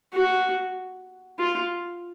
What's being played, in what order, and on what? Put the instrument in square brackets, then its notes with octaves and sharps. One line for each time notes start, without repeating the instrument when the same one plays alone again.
[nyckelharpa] F#4
F4